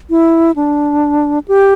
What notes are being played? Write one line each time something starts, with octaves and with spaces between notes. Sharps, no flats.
E4
D4
G4